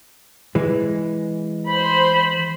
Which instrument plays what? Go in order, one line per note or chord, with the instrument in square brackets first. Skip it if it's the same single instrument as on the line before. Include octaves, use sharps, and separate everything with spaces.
[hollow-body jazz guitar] E3 G#3
[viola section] C5 B5